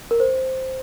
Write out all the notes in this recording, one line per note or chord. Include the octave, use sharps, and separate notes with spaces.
A#4
C5